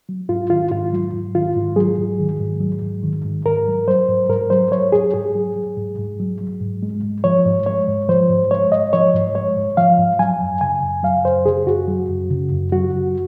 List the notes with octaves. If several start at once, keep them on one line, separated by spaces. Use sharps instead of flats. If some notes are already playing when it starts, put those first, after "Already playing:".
F#3
G#2 F4
D#3 F4
G#2 F4
F#3
G#2
D#3 F4
G#2
F#3 G#4
G#2
D#3
G#2
F#3
G#2
D#3
G#2
G#2 A#4
F#3
F#3 C5
G#2
G#2 A#4
F#3 C5
F#3 C#5
G#2 G#4
G#2 G#4
F#3
F#3
G#2
G#2
F#3
F#3
G#2
G#3
G#2
F3 C#5
G#2
G#3 C#5
G#2
F3 C5
G#2
G#3 C#5
G#2 D#5
F3 C#5
G#2
G#3 C#5
G#2
F3 F5
G#2
F#3 G#5
F#2
C#3 G#5
F#2
F#3 F5
F#2 C5
C#3 G#4
F#2 F#4
F#3
F#2
C#3
F#2
F#3 F#4
F#2